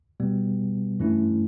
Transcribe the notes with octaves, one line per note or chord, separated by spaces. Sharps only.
B2 G3 B3
G2 E3 A3 C#4 E4